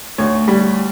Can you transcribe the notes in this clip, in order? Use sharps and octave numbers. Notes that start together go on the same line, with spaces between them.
D2 C#5
G3